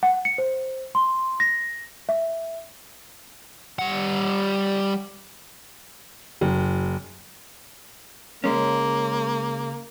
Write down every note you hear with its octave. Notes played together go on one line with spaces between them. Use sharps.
F#5
C#7
C5
C6
A#6
E5
G3 F#5
F#1
C#2 G#3 A#3 C#4